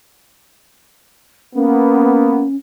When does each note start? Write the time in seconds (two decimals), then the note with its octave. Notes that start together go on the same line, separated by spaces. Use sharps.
1.54 A#3 B3 C#4